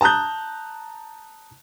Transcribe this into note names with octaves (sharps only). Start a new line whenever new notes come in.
A5 A#5 D#6 F#6 G6